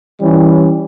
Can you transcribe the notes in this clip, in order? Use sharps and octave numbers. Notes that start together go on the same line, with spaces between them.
E3 G3 C#4